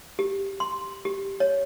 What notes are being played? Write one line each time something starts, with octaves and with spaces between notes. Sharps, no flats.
G4
C6
G4
C#5